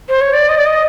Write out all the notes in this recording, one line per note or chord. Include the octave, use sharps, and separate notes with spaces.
C5
C#5
D5
D#5
D5
D#5